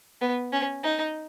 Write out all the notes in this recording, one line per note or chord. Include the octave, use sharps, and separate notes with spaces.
B3
C#4
D#4